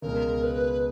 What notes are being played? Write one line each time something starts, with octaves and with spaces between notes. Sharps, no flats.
C#2 B2 G#3 A#4
B4